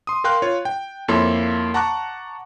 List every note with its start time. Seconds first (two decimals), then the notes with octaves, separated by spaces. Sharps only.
0.07 C6 D#6
0.24 A#4 F5 G5 C6 F#6
0.42 F4 C#5
0.65 G5
1.08 F2 A#3 E4 A4 C#5 C6
1.74 F#5 A5 A#5 C#6 D6 F#6